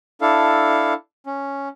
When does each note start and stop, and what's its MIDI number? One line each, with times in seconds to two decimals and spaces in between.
0.21 0.94 62
0.21 0.94 64
0.21 0.94 69
0.21 0.94 77
1.26 1.69 61